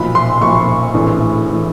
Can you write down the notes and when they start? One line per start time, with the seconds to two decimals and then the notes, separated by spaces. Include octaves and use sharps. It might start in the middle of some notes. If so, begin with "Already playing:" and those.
Already playing: B1 A#2 F3 B5
0.15 C6
0.41 B1 A#2 F3 C#6
0.94 A#1 A2 E3
1.49 A2 E3